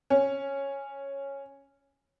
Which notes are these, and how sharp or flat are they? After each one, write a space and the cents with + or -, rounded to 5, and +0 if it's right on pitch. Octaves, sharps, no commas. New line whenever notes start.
C#4 -5